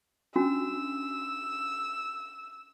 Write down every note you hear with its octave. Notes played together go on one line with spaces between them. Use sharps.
C#4 D4 F#4 E6